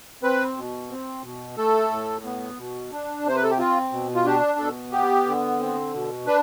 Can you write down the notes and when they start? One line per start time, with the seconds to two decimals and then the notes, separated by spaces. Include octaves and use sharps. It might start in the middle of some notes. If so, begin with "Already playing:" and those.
0.23 C4 B4
0.57 B2
0.90 C4
1.23 B2
1.57 A3 A4
1.91 A2
2.25 B3
2.58 B2
2.92 D4
3.25 C3 C5
3.36 B4
3.43 A4
3.51 G4
3.58 C4 F4
3.92 B2
4.15 F4
4.25 D4 G4
4.59 B2 A4
4.92 B3 G4
5.26 D3
5.60 C4
5.94 B2
6.26 D4 B4